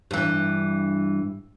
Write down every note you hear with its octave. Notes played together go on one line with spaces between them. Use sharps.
G2 E3